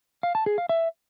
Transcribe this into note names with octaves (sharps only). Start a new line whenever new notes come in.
F5
A5
G#4
F5
E5